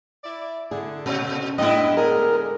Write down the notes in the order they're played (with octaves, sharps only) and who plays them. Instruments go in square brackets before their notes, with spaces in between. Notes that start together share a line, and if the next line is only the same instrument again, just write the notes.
[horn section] E4 D5
[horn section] D3 [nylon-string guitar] E4 G#4
[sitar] A#2 [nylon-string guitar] C#3 C#4
[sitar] F#2 E4 [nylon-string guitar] A2 B3 [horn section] D#5
[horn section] D3 G#3 [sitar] G#4 [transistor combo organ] A#4